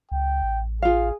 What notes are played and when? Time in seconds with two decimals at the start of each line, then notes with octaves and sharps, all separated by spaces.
0.12 C#2 G5
0.43 A1
0.82 F4 G#4 F5